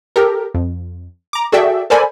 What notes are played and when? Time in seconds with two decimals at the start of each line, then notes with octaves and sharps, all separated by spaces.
0.16 G4 A4 A#4
0.54 F2
1.33 A#5 D6
1.52 F#4 G#4 A4 D5 E5 G5
1.90 A4 A#4 C5 D5 G#5 B5